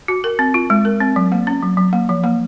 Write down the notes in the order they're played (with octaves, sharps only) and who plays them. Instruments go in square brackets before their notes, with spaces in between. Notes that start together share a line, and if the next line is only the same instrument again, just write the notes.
[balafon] F#4
A#4
C4
F4
G#3
A#4
C4
F#3
A#3
C#4
F#3
F#3
A#3
F3
A#3